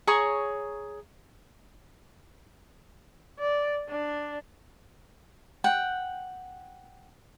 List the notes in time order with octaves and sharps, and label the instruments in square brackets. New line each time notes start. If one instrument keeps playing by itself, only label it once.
[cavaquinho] G#4 C#5 A#5 C#6
[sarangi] D5
D4
[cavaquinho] F#5 G5